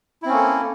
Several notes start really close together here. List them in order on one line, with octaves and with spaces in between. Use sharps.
E4 C4 C#4 A#3 A4